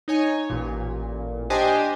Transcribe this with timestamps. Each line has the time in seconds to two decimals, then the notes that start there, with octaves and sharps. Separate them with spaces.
0.08 D#4 C#5 G#5
0.50 A1 A#2
1.50 D4 G4 C5 D#5 G#5